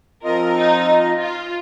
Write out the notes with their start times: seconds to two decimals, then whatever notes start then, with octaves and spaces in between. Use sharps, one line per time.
0.23 F3 C4 F4 A#4 D#5
0.56 D#4
1.19 F4